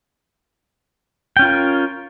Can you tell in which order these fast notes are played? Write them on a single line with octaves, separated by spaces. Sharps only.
G5 C#4 F4 A#4